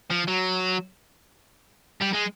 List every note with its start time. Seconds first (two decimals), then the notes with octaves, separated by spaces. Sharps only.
0.11 F3
0.28 F#3
2.01 G3
2.13 G#3